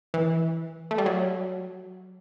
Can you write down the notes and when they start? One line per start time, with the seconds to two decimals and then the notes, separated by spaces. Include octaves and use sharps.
0.14 E3
0.91 A3
0.98 G3
1.06 F#3